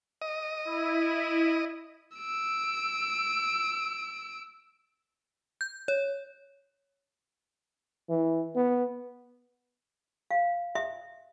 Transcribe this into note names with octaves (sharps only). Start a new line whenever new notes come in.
D#5
E4
E6 D7
G6
C#5
E3
B3
F5
E5